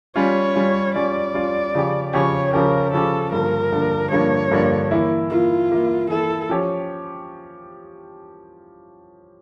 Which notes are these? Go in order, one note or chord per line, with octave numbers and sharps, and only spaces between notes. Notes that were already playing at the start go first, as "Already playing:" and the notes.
G3 C#4 F4 C#5
G3 C#4 F4
G3 C#4 F4 D5
G3 C#4 F4
C#3 F3 C#4 G4
C#3 F3 C#4 G4 C#5
C#3 F3 C#4 G4 A#4
C#3 F3 C#4 G4 A4
G2 D3 F3 A#3 D4 A#4
G2 D3 F3 A#3 D4
G2 D3 F3 A#3 D4 C#5
G2 D3 F3 A#3 D4
E3 A#3 E4
E3 A#3 E4 F4
E3 A#3 E4
E3 A#3 E4 A4
F3 C#4 G4 C#5